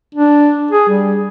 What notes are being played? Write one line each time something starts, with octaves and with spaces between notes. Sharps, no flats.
D4
G#4
G3